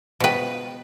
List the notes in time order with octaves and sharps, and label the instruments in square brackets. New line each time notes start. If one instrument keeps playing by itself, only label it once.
[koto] B2 B4 [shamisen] F3 G5